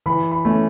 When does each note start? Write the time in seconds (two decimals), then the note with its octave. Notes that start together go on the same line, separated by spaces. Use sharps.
0.06 E3 B5
0.32 B5
0.45 A3 C#4